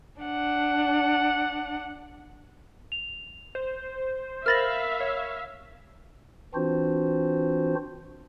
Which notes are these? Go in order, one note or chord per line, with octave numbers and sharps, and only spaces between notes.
D4 F#5
F7
C5
A#4 E5 F5 B5 F6 A6 A#6 F#7
C#5
E3 C4 D4 F4 F#4 C5